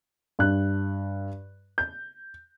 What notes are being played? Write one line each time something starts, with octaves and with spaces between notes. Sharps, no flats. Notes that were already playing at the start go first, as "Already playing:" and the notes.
G2 F#6
G6